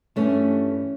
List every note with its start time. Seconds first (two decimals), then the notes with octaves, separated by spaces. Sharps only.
0.16 G2 E3 G3 A3 C#4